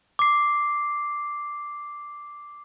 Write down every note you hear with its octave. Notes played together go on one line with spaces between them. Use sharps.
D6 C7